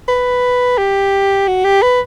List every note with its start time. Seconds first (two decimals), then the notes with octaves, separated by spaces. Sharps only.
0.09 B4
0.78 G4
1.48 F#4
1.65 G4
1.82 B4